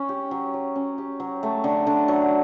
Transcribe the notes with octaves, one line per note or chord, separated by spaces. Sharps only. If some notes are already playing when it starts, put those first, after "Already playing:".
Already playing: C#4
G4
F#3
F#3
C#4
G4
F#3
A3
D3
D3
F#3